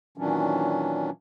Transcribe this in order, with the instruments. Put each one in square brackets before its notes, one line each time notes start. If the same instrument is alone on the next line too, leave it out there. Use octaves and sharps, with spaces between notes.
[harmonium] A#2 D#3 E3 F#3 C#4 D4